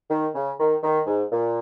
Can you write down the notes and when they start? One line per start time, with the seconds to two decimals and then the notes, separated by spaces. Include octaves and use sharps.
0.10 D#3
0.35 C#3
0.59 D#3
0.83 D#3
1.06 G#2
1.32 A#2